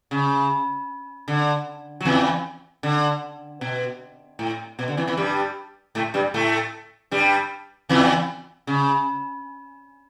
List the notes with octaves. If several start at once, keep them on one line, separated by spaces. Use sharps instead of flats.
C#3
D3
F#3
E2 E3
D3
B2
A2
B2
D3
E2 E3
E2 E3
G2 G3
A2 A3
G2 G3
A2 A3
G2 G3
E2 E3
C#3